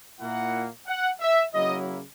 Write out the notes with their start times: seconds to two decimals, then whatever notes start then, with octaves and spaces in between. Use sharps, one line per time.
0.19 A#2 A#3 E4 F#5
0.86 F#5
1.20 E5
1.52 C#3 F#3 A#3 E4 D#5